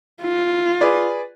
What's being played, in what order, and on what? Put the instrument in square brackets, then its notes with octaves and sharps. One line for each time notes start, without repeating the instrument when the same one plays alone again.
[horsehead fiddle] F4
[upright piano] G#4 B4 D5